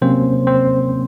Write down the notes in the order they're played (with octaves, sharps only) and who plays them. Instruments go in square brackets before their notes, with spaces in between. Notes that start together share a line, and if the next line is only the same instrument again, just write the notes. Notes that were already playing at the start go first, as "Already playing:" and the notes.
[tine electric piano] C3 F#3 A#3 C4 C#4 C5
C4 C5